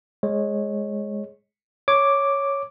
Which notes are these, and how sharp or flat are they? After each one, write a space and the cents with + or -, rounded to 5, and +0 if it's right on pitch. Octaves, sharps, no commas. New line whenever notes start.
G#3 +0 C#5 -15
C#5 +0 D6 +0